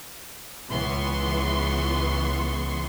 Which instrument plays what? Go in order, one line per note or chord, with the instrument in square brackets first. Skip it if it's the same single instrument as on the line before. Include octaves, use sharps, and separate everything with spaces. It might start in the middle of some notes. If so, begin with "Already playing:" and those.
[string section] C#2 E3 B3 C6 C#6